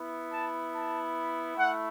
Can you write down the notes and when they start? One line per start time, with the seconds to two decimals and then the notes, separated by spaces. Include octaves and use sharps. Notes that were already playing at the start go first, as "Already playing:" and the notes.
Already playing: B3 E4
0.32 A5
0.74 A5
1.56 A3 E4 F#5